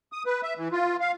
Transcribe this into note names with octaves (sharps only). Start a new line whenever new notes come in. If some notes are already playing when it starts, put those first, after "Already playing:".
D#6
B4
E5
E3
F4
F5